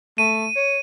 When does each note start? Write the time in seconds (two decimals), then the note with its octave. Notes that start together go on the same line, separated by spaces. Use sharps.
0.18 A3 D#7
0.56 C#5